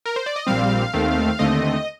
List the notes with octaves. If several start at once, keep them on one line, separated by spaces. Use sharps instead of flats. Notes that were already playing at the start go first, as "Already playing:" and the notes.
A#4
C5
D5
D#5
A#1 A#2 G3 C4 F5
D#2 D#3 A3 C4
D#2 D3 A3 C4 D#5